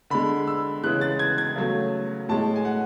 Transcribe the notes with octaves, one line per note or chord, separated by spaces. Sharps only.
D3 G#3 B5
E6
C#3 E3 G#3 F#6
A6
G#6
G#6
C#3 F#3 A3
A2 G#3 A5
G#5
F#5